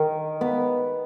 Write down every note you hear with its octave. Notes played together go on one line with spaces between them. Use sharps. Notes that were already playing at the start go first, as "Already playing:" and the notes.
Already playing: D#3
B3